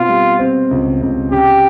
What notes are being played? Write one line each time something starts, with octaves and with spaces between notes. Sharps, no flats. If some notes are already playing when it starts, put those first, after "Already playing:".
Already playing: B2 C4 F4
G3
C4
C#2
C#2
C#3 G4